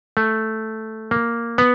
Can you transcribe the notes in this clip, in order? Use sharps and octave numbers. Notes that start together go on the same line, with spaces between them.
A3
A#3
B3